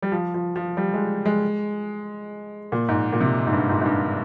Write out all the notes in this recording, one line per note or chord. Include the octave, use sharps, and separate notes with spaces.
G3
F3
F3
F3
G3
G#3
G#3
A#2
G#2
A#2
C3
G#2
G2
G#2
G#2
G2